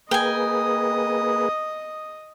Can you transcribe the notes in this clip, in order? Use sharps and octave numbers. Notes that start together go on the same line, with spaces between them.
A#3 G#4 B4 D#5 G5 G#5 D#6